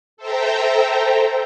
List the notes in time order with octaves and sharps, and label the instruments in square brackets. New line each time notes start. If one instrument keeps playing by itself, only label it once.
[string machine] A4 C5 E5 G5 A#5